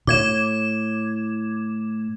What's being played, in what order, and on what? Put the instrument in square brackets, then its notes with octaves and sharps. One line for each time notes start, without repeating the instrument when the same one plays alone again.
[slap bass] A2 [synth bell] D6 G#6 E7